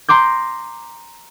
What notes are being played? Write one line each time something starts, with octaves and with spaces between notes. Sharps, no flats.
A#5 C6 D6 G6